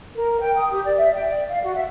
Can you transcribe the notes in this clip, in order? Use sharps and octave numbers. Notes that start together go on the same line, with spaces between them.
A#4
G5
D#6
G4
D5
E5
G5
D5
F5
F#4
E5